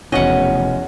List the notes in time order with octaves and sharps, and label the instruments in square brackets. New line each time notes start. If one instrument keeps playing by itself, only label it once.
[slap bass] F1 B2 [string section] E2 [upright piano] C#4 F#4 [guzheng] D#5 F#5